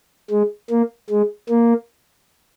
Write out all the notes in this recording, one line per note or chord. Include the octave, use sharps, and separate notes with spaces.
G#3
A#3
G#3
A#3